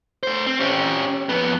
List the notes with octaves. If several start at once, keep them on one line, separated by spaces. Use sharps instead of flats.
A3 C5
C4
C#4 G4
F2 B3